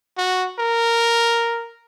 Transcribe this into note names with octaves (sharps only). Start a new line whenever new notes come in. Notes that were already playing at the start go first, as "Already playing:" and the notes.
F#4
A#4